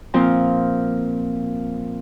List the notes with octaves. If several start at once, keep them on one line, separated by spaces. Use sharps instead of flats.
A#2 F3 C4 F4